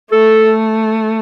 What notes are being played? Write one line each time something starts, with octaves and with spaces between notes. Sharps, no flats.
A3 A4